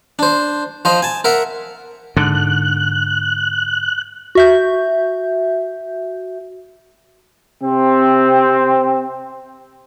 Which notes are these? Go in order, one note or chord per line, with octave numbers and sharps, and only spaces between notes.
D4 C5
F3 C5 D#5
G#5 A5
A#4 E5 F#5
G#2 D3 F#6
F#4 E5 G6
C3 C4